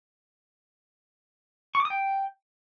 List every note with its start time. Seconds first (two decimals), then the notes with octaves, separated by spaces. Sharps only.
1.75 C#6
1.80 D6
1.85 D#6
1.90 G5